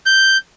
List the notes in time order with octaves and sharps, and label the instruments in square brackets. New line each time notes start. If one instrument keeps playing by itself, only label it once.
[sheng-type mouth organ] G6